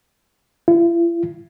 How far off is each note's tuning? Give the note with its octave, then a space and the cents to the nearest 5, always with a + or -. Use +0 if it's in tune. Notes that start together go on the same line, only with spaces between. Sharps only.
E4 +45